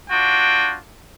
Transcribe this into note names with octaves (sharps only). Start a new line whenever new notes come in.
D4 F4 F#4 G5